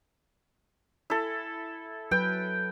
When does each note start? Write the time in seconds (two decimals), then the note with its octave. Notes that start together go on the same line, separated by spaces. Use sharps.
1.10 E4 A4
2.11 F#3 B4 G5